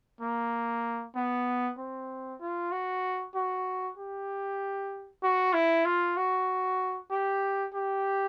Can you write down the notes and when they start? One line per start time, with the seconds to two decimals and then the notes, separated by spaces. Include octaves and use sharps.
0.21 A#3
1.16 B3
1.78 C4
2.40 F4
2.72 F#4
3.35 F#4
3.98 G4
5.23 F#4
5.54 E4
5.85 F4
6.17 F#4
7.10 G4
7.74 G4